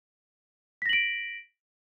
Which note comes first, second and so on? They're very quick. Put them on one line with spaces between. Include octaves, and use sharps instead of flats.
B6 A#6 F#7 D7